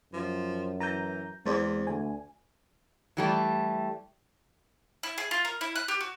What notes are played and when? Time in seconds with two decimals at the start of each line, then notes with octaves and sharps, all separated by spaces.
0.13 F#2 F3
0.80 E3 A#5 G6
1.46 E2 G#3 C4 C5 D5
1.87 D2 G#5
3.17 E3 G3 A3
5.03 E4
5.18 G#4
5.31 F4
5.45 A#4
5.61 E4
5.75 F#6
5.88 G4
6.01 F#4